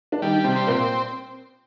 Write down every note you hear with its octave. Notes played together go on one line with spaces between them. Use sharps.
D4
D#3 G3 D#4
C3 C4
C4
A#2 A#3